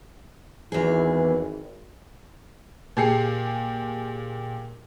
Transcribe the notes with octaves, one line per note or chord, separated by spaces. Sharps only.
G#1 E2 E3 G#4
A#2 G4 G#4 C7 C#7